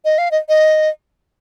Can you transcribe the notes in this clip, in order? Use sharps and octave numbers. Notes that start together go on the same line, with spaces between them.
D#5
F5
D#5
D#5